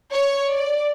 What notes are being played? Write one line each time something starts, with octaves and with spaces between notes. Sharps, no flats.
C#5
D5